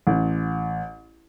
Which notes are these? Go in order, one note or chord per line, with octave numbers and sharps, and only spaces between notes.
A1